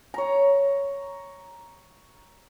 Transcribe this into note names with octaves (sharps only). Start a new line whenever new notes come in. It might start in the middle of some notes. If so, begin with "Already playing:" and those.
C#5 A#5